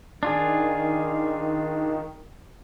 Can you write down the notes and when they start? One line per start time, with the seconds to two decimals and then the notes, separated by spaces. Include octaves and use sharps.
0.23 D#3 D4 F4 G#4